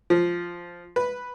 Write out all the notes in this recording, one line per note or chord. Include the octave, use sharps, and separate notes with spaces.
F3
B4